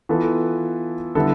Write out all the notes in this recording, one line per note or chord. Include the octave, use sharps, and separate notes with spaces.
E3 B3 F4 A4
D3 G3 B3 E4 A4